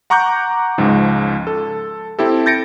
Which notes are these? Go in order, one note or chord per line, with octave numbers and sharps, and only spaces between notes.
F#5 A#5 C#6 D6 F#6 G6
C#2 G#2 F3
A4
C4 E4 G4 A4
G6 A6 A#6 C#7 D7